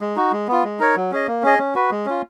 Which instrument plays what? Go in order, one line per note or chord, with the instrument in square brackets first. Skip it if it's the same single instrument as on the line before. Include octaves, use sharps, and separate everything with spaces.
[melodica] G#3
D#4 F#4
G#3
B3 F4
G#3
D#4 A#4 C#5
F#3
C#4 G#4 D#5
A#3
C#4 G#4 D#5
C#4
F#4 B4
G#3
C#4 F4